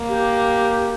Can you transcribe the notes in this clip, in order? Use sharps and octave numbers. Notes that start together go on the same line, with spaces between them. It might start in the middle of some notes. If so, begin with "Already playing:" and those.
Already playing: A#3
G4